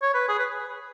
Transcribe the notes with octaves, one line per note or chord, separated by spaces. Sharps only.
C#5
B4
G#4
B4